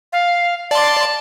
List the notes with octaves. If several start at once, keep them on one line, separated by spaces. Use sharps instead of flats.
F5
D5 A5 C6